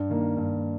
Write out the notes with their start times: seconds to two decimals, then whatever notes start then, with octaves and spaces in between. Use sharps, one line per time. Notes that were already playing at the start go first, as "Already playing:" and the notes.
Already playing: G2
0.10 D#3 A#3
0.37 G2